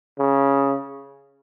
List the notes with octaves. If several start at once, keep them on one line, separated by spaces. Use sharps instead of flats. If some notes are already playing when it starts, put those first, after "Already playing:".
C#3